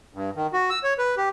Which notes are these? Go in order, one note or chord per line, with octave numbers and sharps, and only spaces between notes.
G2
D#3
F#4
E6
C#5
B4
G4